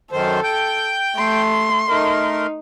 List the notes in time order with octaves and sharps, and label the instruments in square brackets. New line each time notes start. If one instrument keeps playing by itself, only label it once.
[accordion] F#2 D#3 C5 [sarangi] A4
[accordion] G5 G6
[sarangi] A3 [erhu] C6
[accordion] A3 A#4 [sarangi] D#4